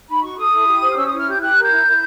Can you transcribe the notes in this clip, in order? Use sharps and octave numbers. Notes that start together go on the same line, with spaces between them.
D#4 B5
F#4 C#6
A4 D#6
E4
G4
C5
F6
C#4 E6
E4 D#6
F6
G4 G6
G4 F#6
A#4
G6
E4
E4